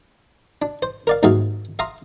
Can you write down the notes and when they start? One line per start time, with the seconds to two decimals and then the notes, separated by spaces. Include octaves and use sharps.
0.62 D4
0.82 C5
1.07 A#4 D5 F5
1.23 D#2 G#2 F#3 G#4 E5 F5
1.79 E5 F5 A#5 C6 D#6